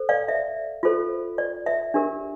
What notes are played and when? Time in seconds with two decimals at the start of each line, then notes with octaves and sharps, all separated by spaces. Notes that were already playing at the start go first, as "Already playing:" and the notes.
Already playing: A4 C5
0.09 D5 F5
0.28 E5
0.83 F4 A4 C5
1.38 D5
1.66 E5
1.94 D4 G4 A#4